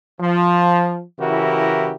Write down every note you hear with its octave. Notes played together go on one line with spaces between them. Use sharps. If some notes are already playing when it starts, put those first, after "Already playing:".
F3
C#3 E3 E4 F#4 G4 A#4